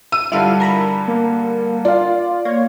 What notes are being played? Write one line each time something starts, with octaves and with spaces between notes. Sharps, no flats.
E6 D#7
G2 D3 G3 E4 F4 F5
A#4 A#5 B5
A#3
F4 D5 F5
A#3 C#5